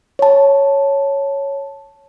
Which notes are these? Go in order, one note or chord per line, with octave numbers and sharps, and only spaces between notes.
C#5 A5